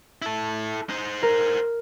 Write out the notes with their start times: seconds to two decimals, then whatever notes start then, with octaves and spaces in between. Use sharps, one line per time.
0.22 E4 A4
0.90 D#4 C5
1.22 A#4